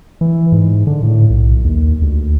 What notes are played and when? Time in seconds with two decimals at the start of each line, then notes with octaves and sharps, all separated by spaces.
0.21 E3
0.52 G#2
0.87 D3
1.03 A2
1.30 B1
1.64 D#2
2.02 D2